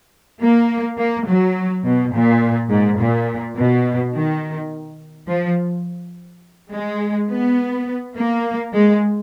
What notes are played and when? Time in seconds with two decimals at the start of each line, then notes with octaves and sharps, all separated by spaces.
0.40 A#3
0.98 A#3
1.27 F#3
1.84 B2
2.13 A#2
2.70 G#2
2.99 A#2
3.56 B2
4.15 D#3
5.28 F3
6.72 G#3
7.30 B3
8.16 A#3
8.73 G#3